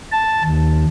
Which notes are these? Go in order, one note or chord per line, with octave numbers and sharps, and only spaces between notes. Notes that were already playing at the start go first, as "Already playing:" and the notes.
A5
D#2